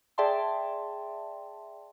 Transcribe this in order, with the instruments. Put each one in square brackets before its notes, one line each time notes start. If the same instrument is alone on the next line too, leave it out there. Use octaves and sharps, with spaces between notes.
[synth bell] G#4 D5 E5 G5 A5 C6